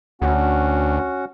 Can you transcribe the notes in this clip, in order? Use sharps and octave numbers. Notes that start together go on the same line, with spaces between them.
D2 C#4 F#4 F#5